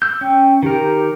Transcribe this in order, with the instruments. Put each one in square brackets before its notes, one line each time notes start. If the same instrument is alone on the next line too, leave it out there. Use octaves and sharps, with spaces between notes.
[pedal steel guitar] E6 G6
[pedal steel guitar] C#4 [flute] G5
[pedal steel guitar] D#3 A#4 [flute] G4